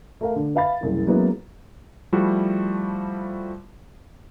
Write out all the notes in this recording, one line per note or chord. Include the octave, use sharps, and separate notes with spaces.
A3 A#4 F5
D3
B4 E5 F5 B5 A6
F#1 C2 E3
F#3 G#3 A#3 B3 C#4 E4
F3 G3 A3 E4 F#4